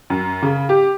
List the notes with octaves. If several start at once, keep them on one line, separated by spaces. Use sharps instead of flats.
F#2
C#3
G4